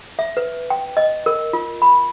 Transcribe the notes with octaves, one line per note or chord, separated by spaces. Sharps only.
E5
B4
G5
D#5
A#4
F4
B5